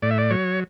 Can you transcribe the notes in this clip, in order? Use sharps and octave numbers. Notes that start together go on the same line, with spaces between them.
A2 D5
E5
D5
F#3 C#5